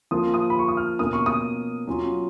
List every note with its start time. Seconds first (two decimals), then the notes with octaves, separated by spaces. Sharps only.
0.11 F3 A#3 F4 D#6
0.34 D#6
0.50 B5
0.59 C#6
0.68 D#6
0.77 F6
0.99 B2 A#3 C#4 D#6
1.13 C#6
1.26 D#6
1.87 F#3 C#4 F4